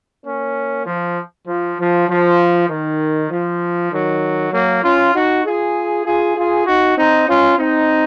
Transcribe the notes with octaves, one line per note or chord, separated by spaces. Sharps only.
A#3 C#4
F3
F3
F3
F3
D#3
F3
D#3 F#3
F#3 A#3
C#4 F4
D#4 F#4
F4 G#4
F4 G#4
F4 G#4
D#4 F#4
C4 D#4
C#4 F4
C4 D#4